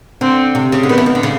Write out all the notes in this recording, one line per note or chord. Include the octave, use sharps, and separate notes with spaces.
D3 C4
C3
C#3
D3
D#3 B3
E3
D#3
D3
C#3